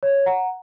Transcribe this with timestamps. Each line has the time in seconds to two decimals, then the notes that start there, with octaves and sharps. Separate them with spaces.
0.03 C#5
0.26 F#5 A#5